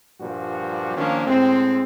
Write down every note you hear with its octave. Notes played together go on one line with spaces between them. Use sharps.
G2 A#2 F3 G3 F#4
D#3 F3 A#3 C#4 D4
A2 G#3 C4